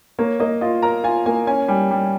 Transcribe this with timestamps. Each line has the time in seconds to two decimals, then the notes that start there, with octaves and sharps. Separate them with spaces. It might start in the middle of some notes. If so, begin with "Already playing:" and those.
0.19 A#3 C#5
0.40 A#3 D#5
0.61 F4 D#5
0.83 A#4 A#5
1.04 F4 G#5
1.26 A#3 G#5
1.47 C#4 G#5
1.68 G3 G#5
1.91 G3